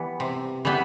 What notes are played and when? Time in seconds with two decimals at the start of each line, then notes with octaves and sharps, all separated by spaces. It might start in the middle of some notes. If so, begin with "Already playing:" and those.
Already playing: E3 G3 B3
0.20 C3
0.65 E3 G3 B3